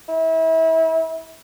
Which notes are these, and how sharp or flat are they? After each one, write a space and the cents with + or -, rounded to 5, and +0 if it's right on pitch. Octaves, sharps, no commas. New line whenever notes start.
E4 -30